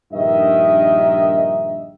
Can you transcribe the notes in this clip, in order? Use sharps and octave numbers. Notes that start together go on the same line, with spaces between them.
A#1 G2 D#3 D#4 D#5 E5